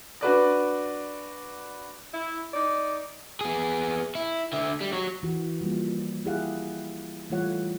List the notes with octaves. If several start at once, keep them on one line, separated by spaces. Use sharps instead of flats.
D4 F#4 B4 D5
E4
D#4 D5
B3 G#4
E4
D3 E5
G3
F#4 C#5
E3 F#4
F3 G3 A#3
E4 G4 G#4 F5 F#5
E3 G3 A3 F4 C#5 F#5